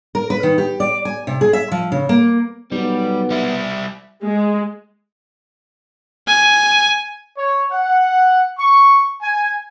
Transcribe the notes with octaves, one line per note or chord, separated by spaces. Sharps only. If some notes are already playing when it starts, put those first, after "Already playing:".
A#4
B4
D#3
G4
D5
G#5
C3
G#4
E5
F3
C#3
A#3
B1 G3 B3
G3 E4
G#3
G#5
C#5
F#5
C#6
G#5